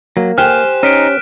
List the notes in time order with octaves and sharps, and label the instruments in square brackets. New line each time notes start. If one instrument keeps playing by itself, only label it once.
[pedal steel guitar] F#3 [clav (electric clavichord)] A#3
[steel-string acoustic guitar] G4 C5 G#5 [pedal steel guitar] F6 [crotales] F#6 E7
[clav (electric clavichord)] C#4 [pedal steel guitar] D#4 [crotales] F6 B6 D7